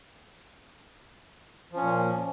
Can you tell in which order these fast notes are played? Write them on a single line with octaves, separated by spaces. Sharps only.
F3 C#4 A#2